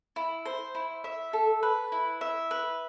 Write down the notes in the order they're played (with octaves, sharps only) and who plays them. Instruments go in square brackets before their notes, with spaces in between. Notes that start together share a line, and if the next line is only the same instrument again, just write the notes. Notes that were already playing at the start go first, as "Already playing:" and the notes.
[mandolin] E4
C5
E4
E5
A4
B4
E4
E5
B4